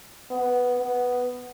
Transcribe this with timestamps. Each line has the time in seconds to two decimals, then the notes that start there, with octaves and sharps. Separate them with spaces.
0.31 B3
0.78 B3